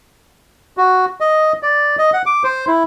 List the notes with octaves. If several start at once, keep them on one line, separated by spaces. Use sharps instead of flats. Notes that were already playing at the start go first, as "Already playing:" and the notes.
F#4
D#5
D5
D#5
F#5
D6
C5
E4